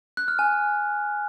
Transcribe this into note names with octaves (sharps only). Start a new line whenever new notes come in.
F#6
F6
G#5